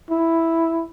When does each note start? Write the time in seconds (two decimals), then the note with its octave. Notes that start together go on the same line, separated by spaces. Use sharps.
0.10 E4